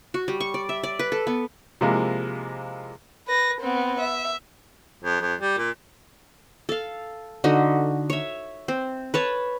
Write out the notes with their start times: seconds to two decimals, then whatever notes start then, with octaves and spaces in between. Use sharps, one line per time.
0.14 F#4
0.28 G3
0.40 C#6
0.54 D5
0.69 E5
0.83 D5
0.99 B4
1.12 A4
1.27 B3
1.81 C3 F3 G#3 A#3 E4
3.28 B4 A#6
3.61 B3 C4
4.00 E5
5.04 F2
5.22 F2
5.41 G3
5.58 A#2
6.69 A4 F5
7.44 D3 D#4 F#4
8.10 C#5 E5
8.68 C4
9.14 B4 C#5 A5